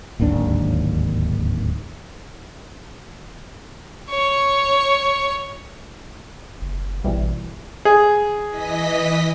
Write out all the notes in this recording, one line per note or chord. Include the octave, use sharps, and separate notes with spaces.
D1 G#1 D#2 D4
C#5 C#6
F#1
A#1 B2 E3 G3
A1
G#4
E3 D#5 B6